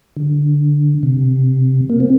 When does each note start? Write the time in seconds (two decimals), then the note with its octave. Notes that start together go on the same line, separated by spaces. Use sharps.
0.17 D3
1.03 C3
1.90 A#3
2.00 C4